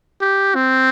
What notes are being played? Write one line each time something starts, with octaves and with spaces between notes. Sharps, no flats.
G4
C4